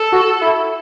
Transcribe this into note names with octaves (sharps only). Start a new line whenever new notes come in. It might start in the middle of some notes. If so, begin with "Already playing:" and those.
Already playing: A4
F#4
E4